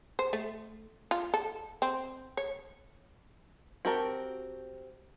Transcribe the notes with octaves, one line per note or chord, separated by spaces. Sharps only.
C5
A3
F4
A4
C4
C#5
C4 F#4 G4 A#4 A5